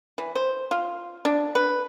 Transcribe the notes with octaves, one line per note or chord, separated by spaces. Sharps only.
E3
C5
F4
D4
B4